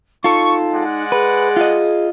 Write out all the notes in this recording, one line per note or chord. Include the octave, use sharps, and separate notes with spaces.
D#4 F4 A4 C#6
G#3 D5 F#5
G#4 B4
F4 D#5